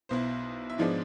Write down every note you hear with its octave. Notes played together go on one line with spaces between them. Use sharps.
B1 B2 B3 E4 C5
E5
G#2 F3 G#3 B3 D4 D5